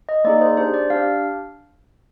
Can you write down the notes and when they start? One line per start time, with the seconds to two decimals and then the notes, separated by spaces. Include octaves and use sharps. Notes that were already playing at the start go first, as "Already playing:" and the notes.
0.09 D#5
0.24 A#3 D#4 G#4 D5
0.41 C5
0.57 D4 G4 C5
0.74 D5
0.90 D4 G4 F5